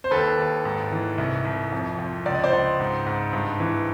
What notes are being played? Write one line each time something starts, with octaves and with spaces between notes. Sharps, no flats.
C5
D#2 A4 B4
D#2
G#2
E3
C2
C2
F2
F2
C#2 D5
D#5
C5 D5
C#2
G#2
G#2
G2
E3